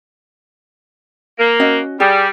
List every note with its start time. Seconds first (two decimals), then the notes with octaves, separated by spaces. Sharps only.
1.39 A#3
1.60 C#4 F#4 D#5
2.00 G3 G4 G#4